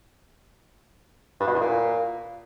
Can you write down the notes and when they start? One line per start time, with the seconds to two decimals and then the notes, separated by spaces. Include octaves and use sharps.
1.40 G2
1.47 B2
1.54 E2
1.61 A#2